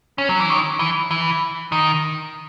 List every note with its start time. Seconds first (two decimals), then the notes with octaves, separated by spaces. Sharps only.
0.18 C#4
0.29 F#3
0.40 E3
0.50 D#3
0.79 E3
1.11 E3
1.72 D#3